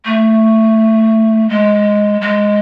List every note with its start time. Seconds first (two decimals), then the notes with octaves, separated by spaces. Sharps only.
0.05 A3
1.49 G#3
2.21 G#3